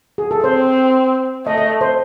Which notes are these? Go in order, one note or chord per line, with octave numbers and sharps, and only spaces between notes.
G#4
A4
C4 C5
A3 D#5
D#5
C5